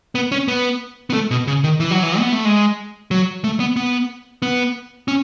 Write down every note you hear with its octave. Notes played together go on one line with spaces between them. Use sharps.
B3
C#4
B3
B3
A3
B2
C#3
D#3
E3
F#3
E3
B3
A3
G#3
F#3
A3
B3
B3
B3
C#4